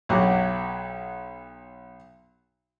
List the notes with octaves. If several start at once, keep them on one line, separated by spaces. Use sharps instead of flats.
B1 F#3 F#4 G4